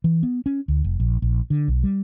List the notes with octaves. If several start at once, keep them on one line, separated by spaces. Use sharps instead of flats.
E3
B3
C#4
D2
F1
A#1
A#1
D3
B1
G3